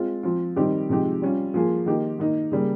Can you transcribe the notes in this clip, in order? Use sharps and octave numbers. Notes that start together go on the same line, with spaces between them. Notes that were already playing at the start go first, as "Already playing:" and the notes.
Already playing: G#3 C4 F4
F3 C4 F4
D#3 G3 C4 D#4 G4
C3 F3 G#3 D#4 G4
G3 C#4 F4
F3 A#3 F4 G#4
D#3 A#3 D#4 G4
D#3 A#3 D#4
C#3 G3 A#3